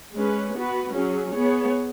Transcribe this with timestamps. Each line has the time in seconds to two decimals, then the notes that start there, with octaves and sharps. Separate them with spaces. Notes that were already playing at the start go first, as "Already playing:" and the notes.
0.14 G#3 C#4 B4
0.55 B3 F#4 B4
0.94 F#3 C#4 G#4
1.35 B3 G#4 C#5